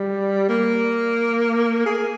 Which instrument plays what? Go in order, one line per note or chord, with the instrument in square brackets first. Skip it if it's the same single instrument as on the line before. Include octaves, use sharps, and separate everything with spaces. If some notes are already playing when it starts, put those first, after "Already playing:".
Already playing: [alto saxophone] G3
A#3
G#4